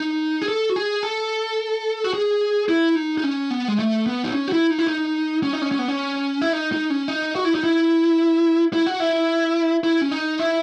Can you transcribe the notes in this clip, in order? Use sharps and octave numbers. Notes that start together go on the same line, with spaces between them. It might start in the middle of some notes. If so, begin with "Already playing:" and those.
Already playing: D#4
G#4
A4
F#4
G#4
A4
F#4
G#4
E4
D#4
D#4
C#4
B3
G#3
A3
B3
D#4
C#4
F#4
E4
D#4
E4
D#4
C#4
D#4
C#4
C#4
B3
C#4
E4
D#4
D#4
C#4
D#4
F#4
E4
D#4
E4
E4
F#4
E4
E4
C#4
D#4
E4